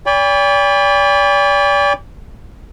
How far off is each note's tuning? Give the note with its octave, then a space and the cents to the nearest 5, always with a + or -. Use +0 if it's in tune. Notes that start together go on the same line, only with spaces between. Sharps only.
D5 -35 G5 +45 B5 +0